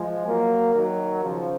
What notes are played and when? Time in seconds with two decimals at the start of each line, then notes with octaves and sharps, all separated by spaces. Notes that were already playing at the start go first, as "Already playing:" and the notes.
Already playing: F3 G#3
0.26 F#3 A#3
0.75 D#3 F#3
1.23 C#3 F3